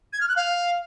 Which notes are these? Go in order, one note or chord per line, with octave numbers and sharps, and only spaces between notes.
G#6
F6
F#6
F5